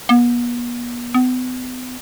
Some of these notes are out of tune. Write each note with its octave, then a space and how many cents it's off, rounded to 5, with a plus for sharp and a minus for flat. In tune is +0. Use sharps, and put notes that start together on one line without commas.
B3 -40
B3 +40